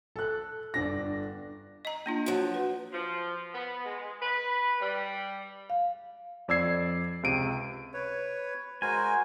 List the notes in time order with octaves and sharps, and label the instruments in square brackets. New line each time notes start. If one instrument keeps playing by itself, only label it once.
[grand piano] A4 F#6
G1 D4 A#6
[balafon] D#5 A#5
A#3 D4 F4
[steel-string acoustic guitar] F3 F#3
[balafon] B4
[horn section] F3
B3
G#3
B4
G3
[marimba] F5
[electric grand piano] F2 D5 E6 G#6 C7
C#2 C3 D7 D#7
[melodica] B4 C#5
[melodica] G#3 [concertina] F#4 A#4 C5 [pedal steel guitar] G#5